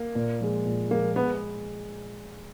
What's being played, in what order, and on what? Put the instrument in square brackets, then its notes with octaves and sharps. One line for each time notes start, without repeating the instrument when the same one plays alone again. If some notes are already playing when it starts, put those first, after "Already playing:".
Already playing: [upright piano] A#3
[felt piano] A#2
F3 G#3
A#2
[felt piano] F3 G#3 [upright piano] A#3
[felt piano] G#3 [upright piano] B3